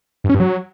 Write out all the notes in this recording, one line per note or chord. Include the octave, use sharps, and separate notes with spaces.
G2
C#4
G2
F#3